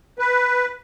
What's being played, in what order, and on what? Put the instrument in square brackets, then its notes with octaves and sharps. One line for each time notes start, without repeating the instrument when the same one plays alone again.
[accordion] B4